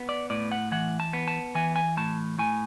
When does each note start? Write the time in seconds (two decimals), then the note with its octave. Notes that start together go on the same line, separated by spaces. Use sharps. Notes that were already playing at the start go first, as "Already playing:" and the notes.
Already playing: B3
0.09 D5
0.30 A2 D5
0.52 F#5
0.72 E3 F#5
1.00 A5
1.13 B3
1.28 A5
1.55 E3 G#5
1.76 G#5
1.97 A2 A5
2.39 A2 G#5